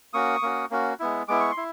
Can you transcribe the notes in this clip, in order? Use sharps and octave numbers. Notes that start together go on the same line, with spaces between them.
A#3 C#4 F#4 C#6 D#6
A#3 C#4 F#4
A#3 C#4 F#4
G#3 B3 E4
G#3 B3 E4 D6
C#6
C6
E4